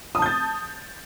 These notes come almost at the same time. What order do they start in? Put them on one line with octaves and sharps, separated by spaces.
D#6 A5 G6 A6